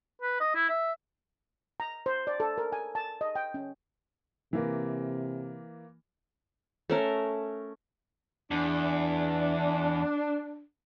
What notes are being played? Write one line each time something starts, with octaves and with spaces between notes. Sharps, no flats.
B4
D#5
E4
E5
A#5
C5
D5
A4
A#4
G#5
A5
D#5
G5
C#4
C3 E3 A#3
A3 C#4 A#4
E2 D4